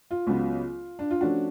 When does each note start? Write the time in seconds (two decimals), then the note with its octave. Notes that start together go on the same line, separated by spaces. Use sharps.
0.11 F4
0.27 C#2 C#3 F#3 B3
0.99 D4
1.11 F4
1.21 F3 A3 C#4 D4 F#4